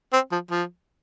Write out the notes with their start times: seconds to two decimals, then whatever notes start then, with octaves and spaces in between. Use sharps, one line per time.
0.13 C4
0.32 F3
0.51 F3